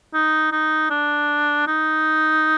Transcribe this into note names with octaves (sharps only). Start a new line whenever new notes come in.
D#4
D#4
D4
D#4